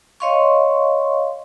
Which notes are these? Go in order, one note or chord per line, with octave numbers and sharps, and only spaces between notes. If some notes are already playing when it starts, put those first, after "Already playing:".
C#5 D#5 F5 C6 C#6